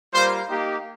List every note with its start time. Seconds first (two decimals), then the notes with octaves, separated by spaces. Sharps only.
0.13 G3 A#3 F4 C5
0.48 A#3 D#4 G4